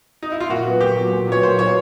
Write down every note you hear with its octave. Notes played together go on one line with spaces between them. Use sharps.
D#4
E4
F4
A#2 F#4
F#3 B3
A#2 G4
F#3 B3
A#2
F#3 B3 C#5
A#2 C5
F#3 B3 C#5